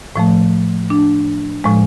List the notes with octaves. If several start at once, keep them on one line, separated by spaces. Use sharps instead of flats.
A2 F3 A3
D4
A2 F3 G#3